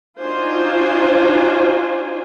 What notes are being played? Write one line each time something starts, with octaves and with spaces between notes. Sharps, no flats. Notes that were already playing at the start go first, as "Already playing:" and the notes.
D4 D#4 F4 F#4 C5 G#5